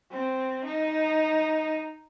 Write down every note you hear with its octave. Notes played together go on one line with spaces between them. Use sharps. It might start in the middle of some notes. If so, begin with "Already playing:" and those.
C4
D#4